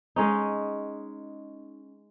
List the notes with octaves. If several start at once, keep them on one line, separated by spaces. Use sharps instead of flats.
G#3 C#4 D#4